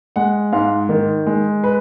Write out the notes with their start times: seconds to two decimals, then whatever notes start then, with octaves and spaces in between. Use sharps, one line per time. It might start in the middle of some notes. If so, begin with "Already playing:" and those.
0.16 G#3 F#5
0.52 G#2 F5
0.89 D#3
1.27 G#3
1.64 B4